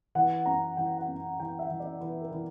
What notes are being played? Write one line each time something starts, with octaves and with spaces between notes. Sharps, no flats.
E3 F#5
F#2 A#5
E3 G5
F#5
F#2
E3 G5
E5
E3
D5
E3 B4
A#4
E3